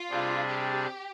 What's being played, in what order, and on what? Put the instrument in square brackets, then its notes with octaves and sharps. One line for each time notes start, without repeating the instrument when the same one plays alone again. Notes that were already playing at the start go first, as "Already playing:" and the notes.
Already playing: [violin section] F4
[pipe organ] C3 G3 D4 G#4
[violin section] G4